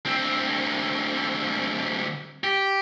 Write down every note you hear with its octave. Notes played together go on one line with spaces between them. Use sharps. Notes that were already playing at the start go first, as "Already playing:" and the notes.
D2 C4
G4